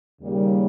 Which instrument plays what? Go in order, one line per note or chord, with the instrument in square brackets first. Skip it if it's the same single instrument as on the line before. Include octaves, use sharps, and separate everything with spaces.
[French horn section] D#2 C#3 G3 A#3